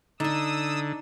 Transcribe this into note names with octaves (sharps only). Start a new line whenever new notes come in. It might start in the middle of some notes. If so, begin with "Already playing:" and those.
D3 D4 D#4 D#6 E6